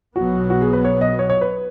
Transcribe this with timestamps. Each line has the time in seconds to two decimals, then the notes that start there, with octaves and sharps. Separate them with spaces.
0.16 B1 B2 F#3 B3 F#4
0.50 F#4
0.61 G#4
0.73 B4
0.85 C#5
1.01 D#5
1.19 C#5
1.30 C#5
1.41 B4